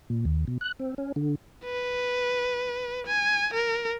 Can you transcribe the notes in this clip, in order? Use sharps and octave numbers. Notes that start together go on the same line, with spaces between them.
A#2
D#2
B2
F#6
C4
C#4
D3
B4
G#5
A#4